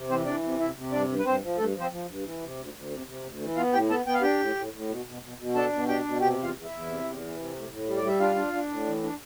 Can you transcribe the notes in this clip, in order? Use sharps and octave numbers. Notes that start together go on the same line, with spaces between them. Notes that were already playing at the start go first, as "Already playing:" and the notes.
Already playing: C3
E3 C4 C5
E3 D4 D5
C3
C3 E4 E5
C3
G2 D4 D5
G2
B4
G2 C4 C5
F3
G2 A3 A4
F3
C4 C5
F3
G2
E3
C3
D2
D2
C3
C3
D2
E3
B3 F4 F5
A2 G4 G5
B3 A4 A5
B3 G5
F5
D4 G4 G5
A2
A2
A2
B2
B2
B2
B2
D4 A4 A5
B2
D4 G4 G5
B2
C3 G4 G5
E2
F4 F5
E2
E4 E5
E2
C3
E2
E3
C3
A2
A2
G3
D5
G3 E5
D4 F4 F5
D4
D4
A2
E3
D4